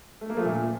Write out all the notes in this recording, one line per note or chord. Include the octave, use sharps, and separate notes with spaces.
A3
A#3
F3 A3
A#2